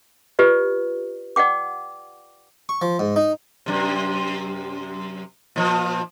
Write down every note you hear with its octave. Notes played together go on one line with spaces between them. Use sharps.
F4 G4 B4 D5
D5 F#5 G5 D6
C#6
F3
G#2
D#4
F#2 C3
A#2 F3